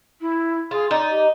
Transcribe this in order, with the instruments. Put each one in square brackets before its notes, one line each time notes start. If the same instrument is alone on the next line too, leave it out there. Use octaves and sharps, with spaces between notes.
[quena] E4
[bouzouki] F4 [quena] G#4
[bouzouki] D#4 [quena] D5
[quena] G4